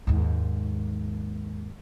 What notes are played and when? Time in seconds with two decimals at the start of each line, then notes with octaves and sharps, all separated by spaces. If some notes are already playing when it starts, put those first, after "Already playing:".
0.07 D#2 G#2